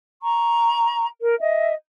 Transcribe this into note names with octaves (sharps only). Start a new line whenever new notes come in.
A#5 C#6
A#4
D#5 E5